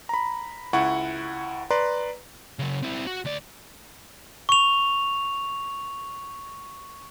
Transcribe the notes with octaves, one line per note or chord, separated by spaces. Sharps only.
A#5 B5
C#2 E4 F#5 C#6
B4 D5 A#5 C6
C#3 F#3
C4 E4
F#4
D2 D5
C#6 F7